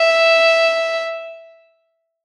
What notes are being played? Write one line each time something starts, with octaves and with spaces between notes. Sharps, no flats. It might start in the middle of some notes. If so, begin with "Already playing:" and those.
Already playing: E5